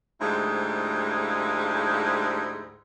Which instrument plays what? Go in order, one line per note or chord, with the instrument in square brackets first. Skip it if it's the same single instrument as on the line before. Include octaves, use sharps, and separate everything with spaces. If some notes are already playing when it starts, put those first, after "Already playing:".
[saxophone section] D2 G#2 F3 G3 G#3 E4